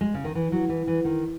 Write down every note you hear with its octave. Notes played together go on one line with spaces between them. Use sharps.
G#3
C#3
D#3
E3
F#3
E3
E3
D#3